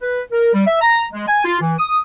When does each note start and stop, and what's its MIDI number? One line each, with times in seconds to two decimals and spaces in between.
0.01 0.22 71
0.32 0.51 70
0.54 0.63 55
0.67 0.81 76
0.81 1.04 82
1.13 1.26 56
1.28 1.44 80
1.45 1.58 65
1.61 1.73 52
1.79 1.98 87